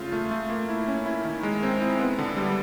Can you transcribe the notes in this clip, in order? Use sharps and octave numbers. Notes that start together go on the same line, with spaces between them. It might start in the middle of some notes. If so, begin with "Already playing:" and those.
Already playing: C#3 A3 F4
A3
A3
A#3
E4
C#4
E4
D#3
G#3
C4
E4
B3
D3
G3